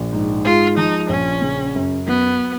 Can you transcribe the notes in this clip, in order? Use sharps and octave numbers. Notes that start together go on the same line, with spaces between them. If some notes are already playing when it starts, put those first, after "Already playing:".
Already playing: A#1
G#2
G#3 F4
F3 D#4
A#1 C#4
C#3
F#2
F#3 B3